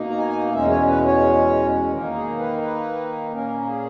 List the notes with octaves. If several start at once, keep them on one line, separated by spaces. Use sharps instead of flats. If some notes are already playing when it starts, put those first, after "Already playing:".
Already playing: B2 A#3 D#4
A#5
G#5
E2 B2 G#3 C#4 E5
C#5
B4
C#5
D#3 A#3 D#4 A#4
G#4
B4
B4
A#2 A#3 C#4 A#4
A#4
G#4